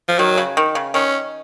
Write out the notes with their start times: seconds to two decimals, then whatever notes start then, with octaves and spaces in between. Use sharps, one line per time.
0.08 F3
0.19 D#3 F#3
0.38 C#3
0.57 D#3
0.75 C#3
0.94 D#3 C#4